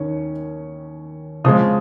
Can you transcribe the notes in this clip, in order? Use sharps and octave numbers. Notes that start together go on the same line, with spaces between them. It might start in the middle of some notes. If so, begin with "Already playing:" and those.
Already playing: D#2 D#3 C#4
C#3 F3 G#3 D#6